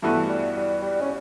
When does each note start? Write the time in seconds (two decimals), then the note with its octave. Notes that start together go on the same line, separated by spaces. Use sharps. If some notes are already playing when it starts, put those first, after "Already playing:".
0.02 G2 E3 A3 B3 F#4 B4
0.29 G3
0.56 G3
0.82 G3
1.01 C#4